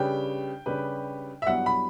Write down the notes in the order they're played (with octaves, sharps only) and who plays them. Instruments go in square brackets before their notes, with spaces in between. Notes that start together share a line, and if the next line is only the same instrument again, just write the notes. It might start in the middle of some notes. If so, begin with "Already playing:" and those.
Already playing: [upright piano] C#3 G3 D4 G4 B4 [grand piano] G5
[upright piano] C#3 G3 D4 G4 B4
[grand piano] E5
[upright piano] G2 F#3 B3 E4 [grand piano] F#5
[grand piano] B5